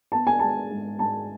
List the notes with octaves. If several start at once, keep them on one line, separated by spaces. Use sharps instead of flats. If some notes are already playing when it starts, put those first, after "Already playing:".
B3 A5
G#5
G#3 A5
G#2
G#2 A5